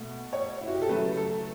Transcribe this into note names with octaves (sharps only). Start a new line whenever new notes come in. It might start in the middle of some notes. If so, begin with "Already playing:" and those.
Already playing: B2 A3
C#5
E4
F#4
G4
A4
C#3 F#3 A3 B4
A4